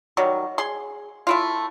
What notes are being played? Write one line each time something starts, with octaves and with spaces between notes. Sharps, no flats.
D#3 F#3 G3
G#4 C6
A3 E4 F4